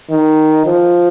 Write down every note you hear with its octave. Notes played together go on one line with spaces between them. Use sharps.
D#3
F3